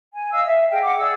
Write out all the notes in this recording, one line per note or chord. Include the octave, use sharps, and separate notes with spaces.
G#5
D#5 F5 E6
E5
G#4 D#5 F5 G5
F#5 D6
G#4 D5 E6